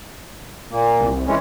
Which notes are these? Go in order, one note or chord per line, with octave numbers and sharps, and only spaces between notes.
A#2 A#3
C2
E3 G#3 C#4